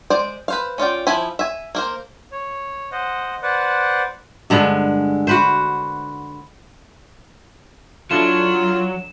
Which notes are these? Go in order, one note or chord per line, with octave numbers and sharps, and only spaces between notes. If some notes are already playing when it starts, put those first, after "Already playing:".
G#3 C5 D5
B4 C5 F5
C#4 F4 D5 G5
F3 E4 G#5 B5
E5 G#5
A#3 A#4 C5
C#5
C5 D#5 F#5
B4 C5 D5 F#5
G2 D3 G#3
F#4 B4 C5
F#3 D4 E4 F4 A4 E7